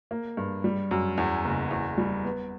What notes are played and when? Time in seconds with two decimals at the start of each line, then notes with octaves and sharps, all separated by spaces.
0.11 A#3
0.37 G2
0.64 G3
0.91 F#2
1.18 E2
1.45 F#1
1.71 E2
1.98 G3
2.25 B3